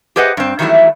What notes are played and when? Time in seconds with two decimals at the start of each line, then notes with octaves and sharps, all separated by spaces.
0.16 G4 G#4 B4 C5 D#5 F#5
0.37 G2 C4
0.59 D#3 E3 F#3 G3 A3 E4